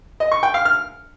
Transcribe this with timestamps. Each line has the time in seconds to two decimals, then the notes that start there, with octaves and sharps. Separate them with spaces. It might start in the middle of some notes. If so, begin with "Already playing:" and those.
0.20 D#5
0.32 C#6
0.43 G5
0.54 F5
0.65 F6